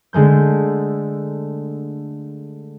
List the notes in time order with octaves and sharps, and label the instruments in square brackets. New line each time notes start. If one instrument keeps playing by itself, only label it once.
[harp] D3 G#3 A3 G6